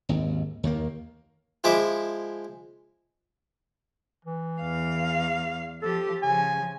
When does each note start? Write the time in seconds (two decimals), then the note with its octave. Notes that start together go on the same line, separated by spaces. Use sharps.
0.09 G#1 D#2
0.63 D#2 D#3 A#3
1.64 F3 G#3 E4 E5 D6
4.25 E3
4.60 E2 F5
5.82 F3 G4 A4
6.22 C#3 F3 G#5